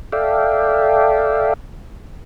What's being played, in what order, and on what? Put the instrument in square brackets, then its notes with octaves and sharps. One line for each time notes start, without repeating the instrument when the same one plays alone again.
[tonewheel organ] A4 D5 E5 F5 G5